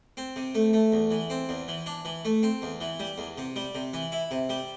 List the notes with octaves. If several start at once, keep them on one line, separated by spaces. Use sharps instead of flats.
C4
C3
A3
A3
E2
E3
C4
E2
E3
D4
E3
A3
C4
E2
E3
G3
E2
C3
G3
C3
E3
E4
C3
G3